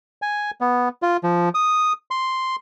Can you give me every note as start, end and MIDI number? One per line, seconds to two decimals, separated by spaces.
0.22 0.51 80
0.61 0.89 59
1.02 1.17 65
1.24 1.49 53
1.55 1.93 87
2.11 2.56 84